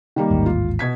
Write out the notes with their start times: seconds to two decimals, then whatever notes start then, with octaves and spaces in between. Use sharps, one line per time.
0.16 D#3 G3 A#3
0.30 A1 D#2 G#2
0.46 F4
0.79 B2 G#6 B6